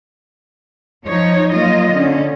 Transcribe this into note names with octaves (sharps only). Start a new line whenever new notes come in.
F3 D#4 C#5
F#3 A#3 F4 D#5
D3 C#4